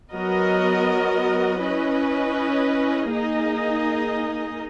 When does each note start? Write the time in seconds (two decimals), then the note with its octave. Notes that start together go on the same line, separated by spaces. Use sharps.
0.13 F#3 B3 F#4 A#4 D#5
1.62 C#4 E4 B4 D#5
3.11 A#3 D#4 G#4 D#5